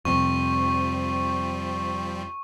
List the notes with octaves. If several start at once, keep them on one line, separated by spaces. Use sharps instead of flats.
F2 C3 F3 G3 C4 C#6